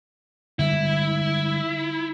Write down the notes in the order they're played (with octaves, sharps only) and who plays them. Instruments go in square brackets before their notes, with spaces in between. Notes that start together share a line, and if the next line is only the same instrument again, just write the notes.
[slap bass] D3 G3 G#3 [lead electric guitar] E4